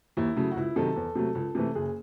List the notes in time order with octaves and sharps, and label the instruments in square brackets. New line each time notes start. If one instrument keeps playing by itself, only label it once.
[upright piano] D#2 E4
C#3 F#3 A3
F#4
C#2 E4
C3 D#3 F#3 A4
E2
C3 F#3 A3
C#2
C3 E3 A3
F#1 G#4